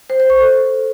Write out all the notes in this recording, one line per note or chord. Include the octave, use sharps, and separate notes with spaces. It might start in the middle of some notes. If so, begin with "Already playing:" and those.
C5
C5
C#6
A4